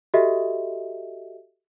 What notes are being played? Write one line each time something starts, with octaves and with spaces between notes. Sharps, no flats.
F#4 G4 A4 D#5 E5